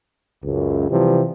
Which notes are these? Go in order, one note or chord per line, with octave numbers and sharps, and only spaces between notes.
C#2 F#2
C3 E3 F3 G3